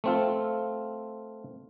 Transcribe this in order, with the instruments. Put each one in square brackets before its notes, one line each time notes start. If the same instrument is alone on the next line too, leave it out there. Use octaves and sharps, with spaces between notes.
[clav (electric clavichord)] A3 C4 F4